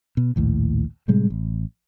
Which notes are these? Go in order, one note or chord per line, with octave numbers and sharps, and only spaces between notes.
B2
A#1 D#2 A2
A2 C3 G3 G#3
A1